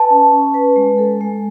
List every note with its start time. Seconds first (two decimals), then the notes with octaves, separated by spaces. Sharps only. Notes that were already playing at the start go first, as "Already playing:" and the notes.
Already playing: B4 A5
0.10 C#4
0.32 C#4
0.54 B4
0.76 G#3
0.98 A4
1.21 G#3